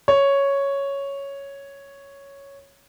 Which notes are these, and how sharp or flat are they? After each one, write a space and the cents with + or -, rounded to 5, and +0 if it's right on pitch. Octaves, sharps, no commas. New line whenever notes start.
C#5 +0